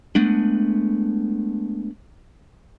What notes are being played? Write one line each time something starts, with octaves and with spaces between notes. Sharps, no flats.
G#3 A3 B3 D4